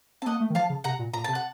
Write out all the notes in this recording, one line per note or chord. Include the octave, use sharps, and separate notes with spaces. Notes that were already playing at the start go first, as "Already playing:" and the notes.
C4 A5
A#3 D#5 F#5
A3
D#3
F3 F5 A5
C#3
C3 F#5 A#5
A#2
A#2 A#5
C3 A5
F#5